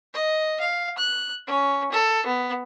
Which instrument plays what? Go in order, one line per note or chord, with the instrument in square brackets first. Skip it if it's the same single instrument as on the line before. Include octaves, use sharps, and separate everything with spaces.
[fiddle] D#5
F5
F#6
C#4
A4
B3